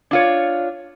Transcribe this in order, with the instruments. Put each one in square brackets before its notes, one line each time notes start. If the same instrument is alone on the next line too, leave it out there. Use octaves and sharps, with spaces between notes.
[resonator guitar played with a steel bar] D4 F4 C#5